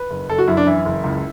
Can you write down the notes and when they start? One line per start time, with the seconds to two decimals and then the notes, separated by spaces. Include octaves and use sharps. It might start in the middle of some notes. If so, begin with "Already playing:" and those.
Already playing: B4
0.10 F#1
0.29 F#1 A4
0.38 F#4
0.47 F#2 E4
0.57 D4
0.67 E3 E4
0.85 F#1
1.04 C#2